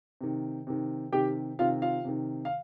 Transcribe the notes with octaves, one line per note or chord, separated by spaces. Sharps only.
C3 D#3
C3 D#3
C3 D#3 G4 G5
C3 D#3 F4 F5
F4 F5
C3 D#3
F5